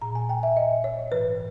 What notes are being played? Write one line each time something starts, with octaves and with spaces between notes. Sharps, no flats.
A#2 A#5
G#5
G5
E5
D#5
C#5
G#2 E3 B4